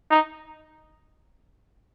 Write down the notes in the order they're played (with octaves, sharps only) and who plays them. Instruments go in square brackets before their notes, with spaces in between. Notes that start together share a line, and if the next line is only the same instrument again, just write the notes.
[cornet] D#4